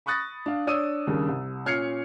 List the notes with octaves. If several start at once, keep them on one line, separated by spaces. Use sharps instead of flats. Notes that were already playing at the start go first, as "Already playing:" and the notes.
B5 C#6 D#6 F#6 A6 A#6
D4 F5
D4 C#5 D5 D#6 E6 D#7
D#2 C#3 G3 D4 A#4
C2
A#2 C#4 F6 G#6 C7 C#7